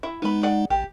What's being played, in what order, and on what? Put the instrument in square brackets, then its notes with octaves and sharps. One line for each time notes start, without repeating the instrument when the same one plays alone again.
[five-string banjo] E4 E5
[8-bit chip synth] G#3 D#4 [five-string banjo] B3 B5
[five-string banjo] G#4 D5 F#5
[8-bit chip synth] A1 [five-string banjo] G4